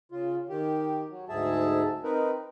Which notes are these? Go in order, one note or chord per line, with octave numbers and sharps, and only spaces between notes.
C#3 F4
D#3 G4
F#3
D2 G#2 G#4 E5 A5
C4 D#4 A#4 B4